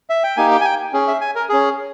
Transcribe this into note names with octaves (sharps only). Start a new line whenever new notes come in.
E5
G5
A#3 D#4 G4 G#5
G5
G#5
G5
C#4 G#4
E5
G#5
A#4
C#4 G#4